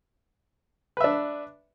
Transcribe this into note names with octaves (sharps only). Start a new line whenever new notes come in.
D4 B4 E5